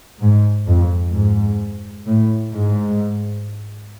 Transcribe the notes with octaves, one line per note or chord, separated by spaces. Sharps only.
G#2
F2
G#2
A2
G#2